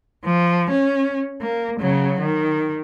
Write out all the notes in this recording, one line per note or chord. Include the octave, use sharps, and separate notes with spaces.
F3
C#4
A#3
C#3 F#3
D#3